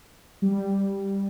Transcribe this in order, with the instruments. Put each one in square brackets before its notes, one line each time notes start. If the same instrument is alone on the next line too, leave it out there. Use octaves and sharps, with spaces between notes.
[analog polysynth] G3